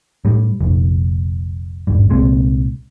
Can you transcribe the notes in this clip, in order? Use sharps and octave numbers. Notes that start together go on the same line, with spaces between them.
A2 G3
F1 A#1
D#1 G#1 G2
C2 A#2 G#3 C4